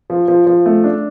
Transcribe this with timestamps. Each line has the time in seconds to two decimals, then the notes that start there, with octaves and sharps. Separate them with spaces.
0.10 F3
0.28 F3
0.46 F3
0.66 A3
0.84 D4